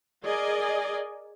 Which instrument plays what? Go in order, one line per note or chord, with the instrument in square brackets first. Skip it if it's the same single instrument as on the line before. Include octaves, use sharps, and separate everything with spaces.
[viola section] G#4 A#4 D5 D#5 G#5